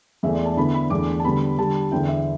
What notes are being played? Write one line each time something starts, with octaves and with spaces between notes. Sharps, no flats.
E2 E3 A3 E5
D5
A5
D3 B3 E4 B5
B5
E2 E3 A3 D4 D6
A5
D3 G3 B3 B5
D3 G3 D4 A5
E2 D3 B3 E4 G5
E5